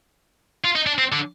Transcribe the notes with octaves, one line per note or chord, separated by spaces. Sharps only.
F4
D#4
D4
C4
D3